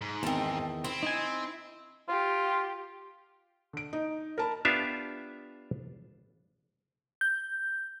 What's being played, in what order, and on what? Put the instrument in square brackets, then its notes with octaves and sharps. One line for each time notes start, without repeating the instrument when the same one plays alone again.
[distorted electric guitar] G#2
[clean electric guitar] E2 D#3 [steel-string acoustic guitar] C4 A5
[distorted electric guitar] C4 [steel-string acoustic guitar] E4
[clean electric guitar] D#4 G#5
[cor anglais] F4 [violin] G4
[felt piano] D3 D7
D#4
A#4 A5 B5
[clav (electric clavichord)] B3 D4 F4 G4 E5 F5
[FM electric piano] G6